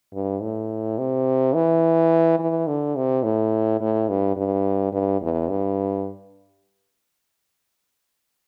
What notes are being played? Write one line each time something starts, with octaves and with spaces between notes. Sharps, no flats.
G2
A2
C3
E3
E3
D3
C3
A2
A2
G2
G2
G2
E2
G2